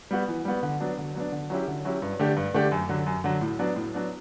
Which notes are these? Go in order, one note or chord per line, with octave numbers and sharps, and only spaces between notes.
G3 B3 F#4
E3
G3 B3 F#4
D3
F#3 B3 D4
D3
F#3 B3 D4
D3
F#3 C#4 E4 G4
D3
F#3 C#4 E4 G4
G2
D3 A3 D4 G4
G2
D3 A3 D4 G4
F#2
D3 F#3
F#2
D3 F#3
A2
F#3 B3 D4
A2
F#3 B3 D4